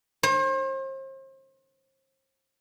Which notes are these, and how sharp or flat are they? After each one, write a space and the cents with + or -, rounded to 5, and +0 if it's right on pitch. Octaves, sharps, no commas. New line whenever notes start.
C5 +40